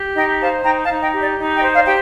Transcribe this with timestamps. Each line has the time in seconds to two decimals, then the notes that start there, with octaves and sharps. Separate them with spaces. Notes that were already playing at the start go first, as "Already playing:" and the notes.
Already playing: G4
0.15 D#4 D#5 G5
0.41 C5 F5 A5
0.64 D#4 G5 A#5
0.82 F5 A5
0.89 D#4
1.01 D#5 G5
1.13 G4
1.19 D5
1.39 D#4
1.56 D#5 G5
1.63 C5
1.75 D5 F5
1.85 G4 G5